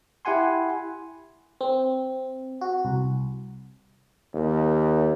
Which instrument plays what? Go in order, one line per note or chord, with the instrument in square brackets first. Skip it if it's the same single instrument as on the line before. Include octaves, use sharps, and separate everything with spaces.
[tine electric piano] E4 G4 F#5 G#5 C6
[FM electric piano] C4
F#4
C2
[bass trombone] D#2